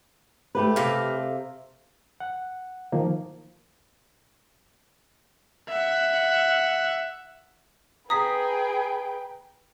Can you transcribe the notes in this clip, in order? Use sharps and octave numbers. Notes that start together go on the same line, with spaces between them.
A3 G4 B4
C3 F5
F#5
D#3 F3 A#3
E5 F#5
G#4 B4 G5 A#5 D#6 B6